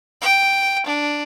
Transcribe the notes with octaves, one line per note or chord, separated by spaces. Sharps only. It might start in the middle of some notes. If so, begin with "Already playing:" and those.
G5
D4